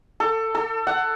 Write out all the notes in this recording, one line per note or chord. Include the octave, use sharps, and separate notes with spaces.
A4
A4
F#5